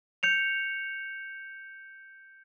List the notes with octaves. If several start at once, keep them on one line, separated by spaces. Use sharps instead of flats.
G6 C#7 F7